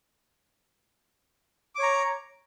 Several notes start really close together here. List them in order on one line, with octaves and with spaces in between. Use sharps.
D6 C#5 A#5